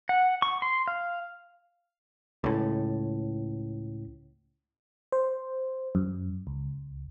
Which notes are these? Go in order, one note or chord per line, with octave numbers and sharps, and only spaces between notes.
F#5
C#6
C6
F5
C#2 A2
C5
F#2
C#2